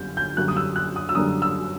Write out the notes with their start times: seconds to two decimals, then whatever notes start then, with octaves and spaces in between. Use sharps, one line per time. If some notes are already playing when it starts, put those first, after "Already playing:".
Already playing: G1 F#2 D3 G3 G6
0.17 G6
0.37 F#2 D3 G3 A#3 D4 F#6
0.48 D#6
0.57 E6
0.76 F#6
0.96 D#6
1.09 E6
1.15 F#2 D3 G3 A#3 D4 D#6
1.42 E6